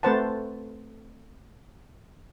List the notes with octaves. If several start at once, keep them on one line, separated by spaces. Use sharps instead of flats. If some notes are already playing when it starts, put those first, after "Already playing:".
A3 C4 B4 C5 F#5 A5